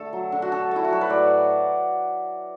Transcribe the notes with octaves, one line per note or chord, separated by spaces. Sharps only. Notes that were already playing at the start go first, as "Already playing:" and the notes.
Already playing: D3 A3 A4
F#3
D3
F#4
D3 A4
A3 E4
F#4
F#3 A4
B4
A2 D5